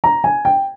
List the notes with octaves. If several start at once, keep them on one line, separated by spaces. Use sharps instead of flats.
A#5
G#5
G5